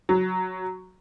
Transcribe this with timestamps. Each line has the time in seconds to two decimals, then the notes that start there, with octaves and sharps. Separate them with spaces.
0.09 F#3